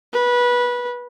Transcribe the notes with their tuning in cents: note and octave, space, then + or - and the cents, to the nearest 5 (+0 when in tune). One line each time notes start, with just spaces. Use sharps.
B4 -20